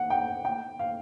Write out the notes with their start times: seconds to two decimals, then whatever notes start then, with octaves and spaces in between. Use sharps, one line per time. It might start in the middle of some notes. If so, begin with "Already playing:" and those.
Already playing: F#5
0.10 G5
0.45 G5
0.79 F5